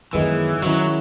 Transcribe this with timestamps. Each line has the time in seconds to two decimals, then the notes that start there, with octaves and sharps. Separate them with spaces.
0.13 F#2 D#3 E3 G#3 B3
0.62 D#3 F#3 G#3 C#4 E4